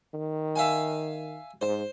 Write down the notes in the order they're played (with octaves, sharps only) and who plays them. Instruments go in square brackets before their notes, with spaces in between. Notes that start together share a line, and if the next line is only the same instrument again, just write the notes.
[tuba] D#3
[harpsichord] E5 F5 G#5
[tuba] G#2 [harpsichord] C5